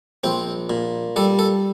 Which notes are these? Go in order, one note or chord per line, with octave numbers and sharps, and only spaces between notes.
A#1 C4
A#2
G3 A4
A4